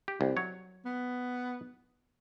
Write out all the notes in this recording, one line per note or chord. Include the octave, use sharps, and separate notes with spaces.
G4
C2
F#3 C#5
B3